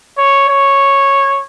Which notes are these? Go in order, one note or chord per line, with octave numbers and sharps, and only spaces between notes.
C#5
C#5